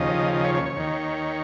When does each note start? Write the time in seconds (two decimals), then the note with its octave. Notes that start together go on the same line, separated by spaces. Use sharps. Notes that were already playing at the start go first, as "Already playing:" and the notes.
Already playing: D#2 C#3 F3 D#5
0.34 D#5
0.44 C#5
0.55 C#5
0.66 C#5
0.76 D#2 D#3